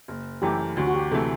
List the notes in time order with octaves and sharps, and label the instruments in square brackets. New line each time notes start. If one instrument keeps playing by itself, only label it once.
[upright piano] F#1
[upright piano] F#2 E3 A3 [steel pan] G4
[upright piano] D2 [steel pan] F#4
[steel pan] F#4
G4
[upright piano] C3 E3 A3 [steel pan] A4